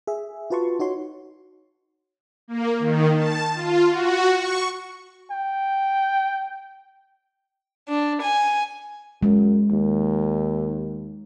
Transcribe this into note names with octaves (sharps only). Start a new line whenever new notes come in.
G#4 E5
F4 F#4 B4 A5 C6 C#6
D#4 F#4 C#5 C6
A#3
D#3
A5
F4
F#4
C#6
G5
D4
G#5
F#2 G#3
D#2